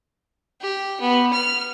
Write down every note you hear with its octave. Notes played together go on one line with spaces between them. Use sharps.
G4
B3
F6